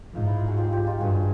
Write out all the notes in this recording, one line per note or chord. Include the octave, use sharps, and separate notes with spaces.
G#2 D#4 F4
E4
D#4 F4
F#4 G#4
F4 G4
F4 G4
D#4 F4
G2 F#4 G#4